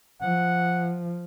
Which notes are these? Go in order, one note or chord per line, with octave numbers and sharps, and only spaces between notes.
F3 F#5